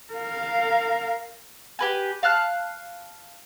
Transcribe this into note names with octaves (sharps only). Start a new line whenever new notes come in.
A#4 F5
G4 B4 G#5
F5 A5 F6 F#6